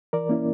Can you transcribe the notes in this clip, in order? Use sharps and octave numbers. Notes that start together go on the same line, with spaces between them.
E3 A#4 D5
A#3 C#4 E4